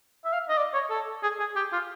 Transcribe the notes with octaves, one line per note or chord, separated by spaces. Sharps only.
E5
F5
D#5
D5
C#5
A4
G#4
G#4
G4
F4